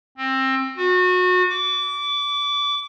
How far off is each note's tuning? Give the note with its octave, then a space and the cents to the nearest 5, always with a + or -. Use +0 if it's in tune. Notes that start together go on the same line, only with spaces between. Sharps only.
C4 +20
F#4 -30
D6 -25